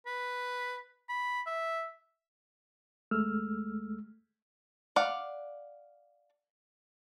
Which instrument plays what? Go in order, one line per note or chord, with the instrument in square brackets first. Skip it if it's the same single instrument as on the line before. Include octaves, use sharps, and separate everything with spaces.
[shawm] B4
B5
E5
[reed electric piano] D#2 G#3 A3 E6 F6
[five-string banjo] D5 F5 F#5